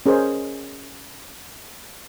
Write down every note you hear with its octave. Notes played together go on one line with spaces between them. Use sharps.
C#4 G#4 A#4 C5 D#5